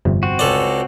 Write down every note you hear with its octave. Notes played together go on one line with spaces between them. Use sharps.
G1 F2 C3
C4 F#4
C#2 A4 D5